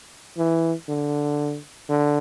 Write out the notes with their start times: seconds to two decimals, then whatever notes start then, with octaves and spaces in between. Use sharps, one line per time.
0.38 E3
0.89 D3
1.90 D3